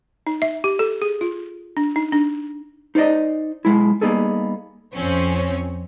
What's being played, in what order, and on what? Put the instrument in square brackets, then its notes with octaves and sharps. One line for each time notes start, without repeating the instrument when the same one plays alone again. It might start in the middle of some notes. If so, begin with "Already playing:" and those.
[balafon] D#4
E5
G4
A4
G#4
F4
D4
D#4
D4
[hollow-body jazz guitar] D#4 C5 D5 D#5
B1 C3 G#3 E4
G3 A#3 B3 D#4 G#4 A4
[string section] F2 F3 C4 C#4 C#5